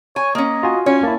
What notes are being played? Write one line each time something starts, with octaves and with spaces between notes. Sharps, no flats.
C#5 G#5
A#3 C#4 D#5
F4 F#4 G#5
C#4 C#5
A#3 E4 A5